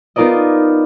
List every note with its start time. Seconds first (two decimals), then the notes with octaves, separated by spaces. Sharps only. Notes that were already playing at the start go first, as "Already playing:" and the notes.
0.16 B3 D#4 F4 A#4 D5 D#5